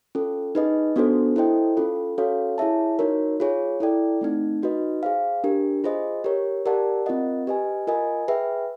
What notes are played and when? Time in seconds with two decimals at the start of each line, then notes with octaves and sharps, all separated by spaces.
0.15 C#4 F4 A4
0.55 D#4 G#4 B4 D#5
0.96 B3 D4 F#4 A4 C5
1.36 E4 A4 C5 D#5 G5
1.77 C#4 F4 A4
2.18 C#4 F#4 A4 C#5 F5
2.58 E4 G#4 C#5 E5 A5
2.99 D#4 F#4 A#4 C#5
3.40 F4 G#4 C#5
3.80 E4 A4 D5 G5
4.21 A3 C4 D#4
4.63 D#4 F#4 B4 D#5
5.03 G#4 C5 F5
5.44 D4 G4 A#4
5.84 F4 G#4 C5 D#5
6.24 G4 A#4 C#5
6.66 G4 A#4 D5 F#5 A5
7.06 C4 F4 A#4 D#5 F#5
7.47 G4 B4 D#5 G#5
7.87 F4 A#4 D#5 G#5
8.28 G#4 B4 E5 G5